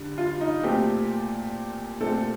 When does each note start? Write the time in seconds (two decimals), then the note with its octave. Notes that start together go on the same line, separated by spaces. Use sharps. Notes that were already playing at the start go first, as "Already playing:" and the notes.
Already playing: D3 G3
0.18 F4
0.41 D#4
0.63 A#2 A3 C4 G4
2.00 A#2 A3 C4 A4